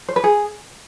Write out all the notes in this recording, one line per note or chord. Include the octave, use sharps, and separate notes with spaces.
C5
B4
G#4